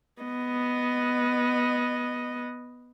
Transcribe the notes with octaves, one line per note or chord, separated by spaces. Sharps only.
B3 D#5